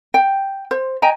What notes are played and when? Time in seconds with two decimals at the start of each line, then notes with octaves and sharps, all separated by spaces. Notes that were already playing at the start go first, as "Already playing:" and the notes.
0.14 G5
0.71 C5
1.02 D#5 G5 G#5 A#5